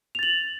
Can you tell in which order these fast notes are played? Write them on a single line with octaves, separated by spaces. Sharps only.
F7 A6 F#7